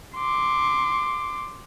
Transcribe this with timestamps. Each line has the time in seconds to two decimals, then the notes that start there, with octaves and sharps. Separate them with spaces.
0.16 C6 D6